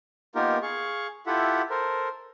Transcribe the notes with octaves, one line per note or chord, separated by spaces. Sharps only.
A#3 B3 D#4 F4 G4 A#4
G#4 F5 C#6
E4 F4 G4 A4 E5 F#5
A4 A#4 C5